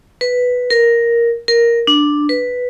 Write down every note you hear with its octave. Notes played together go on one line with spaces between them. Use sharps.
B4
A#4
A#4
D4
B4